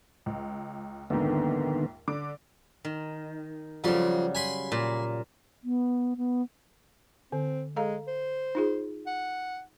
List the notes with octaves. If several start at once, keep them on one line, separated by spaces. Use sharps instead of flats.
C#2
A#1 D#2 G#2 D3 D#3 B3
D3 D6 D7
D#3
F2 C#3 F#3 G3 C6
G#5 B5 C6
A#2
B3
B3
D3 C4
G#3 A4 F5 A#5
C5
D#4 F4 G#4
F#5